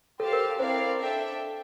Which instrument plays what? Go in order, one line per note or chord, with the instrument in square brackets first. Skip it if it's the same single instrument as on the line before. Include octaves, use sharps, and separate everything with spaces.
[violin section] G4 C5 F5 A5 [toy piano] A4
[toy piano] A#4
[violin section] C4 E4 A#4 D5 F5 [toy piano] C5
[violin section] D4 A4 E5 G5